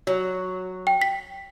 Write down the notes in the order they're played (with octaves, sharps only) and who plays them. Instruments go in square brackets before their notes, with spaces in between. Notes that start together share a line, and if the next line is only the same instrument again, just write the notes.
[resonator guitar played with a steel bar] F#3
[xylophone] G5
B6